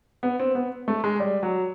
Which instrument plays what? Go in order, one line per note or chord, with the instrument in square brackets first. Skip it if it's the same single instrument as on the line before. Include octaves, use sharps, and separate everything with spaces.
[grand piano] B3
C4
B3
A3
G#3
G3
F#3